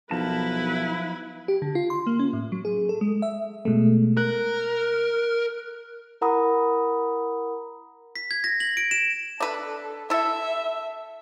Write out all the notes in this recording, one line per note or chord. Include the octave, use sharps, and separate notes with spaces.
B1 F3 E4 A#4 B4 A5
G4
D3
F4
C6
A#3
C#4
A2
F#3
G#4
A4
G#3
E5
B2 G#3 A3
A#4 F#6
E4 A#4 F#5 A#5 B5 D#6
B6
G#6
A#6
F#7
D7
E7
D4 A4 B4
E4 A4 E5